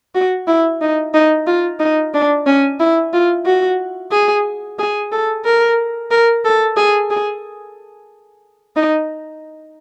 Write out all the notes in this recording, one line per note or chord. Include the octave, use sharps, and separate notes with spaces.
F#4
E4
D#4
D#4
F4
D#4
D4
C#4
E4
F4
F#4
G#4
G#4
A4
A#4
A#4
A4
G#4
G#4
D#4